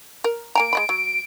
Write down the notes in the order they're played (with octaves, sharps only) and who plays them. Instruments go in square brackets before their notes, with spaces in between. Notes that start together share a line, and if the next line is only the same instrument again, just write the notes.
[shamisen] A#4
[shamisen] A#3 G#5 A#5 [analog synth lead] D7
[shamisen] G#3 D#5 B5
F#3